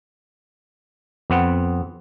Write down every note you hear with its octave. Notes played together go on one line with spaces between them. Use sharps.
F2 B3 C4 F#5